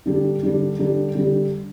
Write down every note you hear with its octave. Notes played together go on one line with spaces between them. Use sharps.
D3 G3 D4 G4
D3 G3 D4 G4
D3 G3 D4 G4
D3 G3 D4 G4